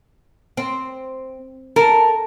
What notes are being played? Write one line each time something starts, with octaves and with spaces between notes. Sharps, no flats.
C4
A4 A#4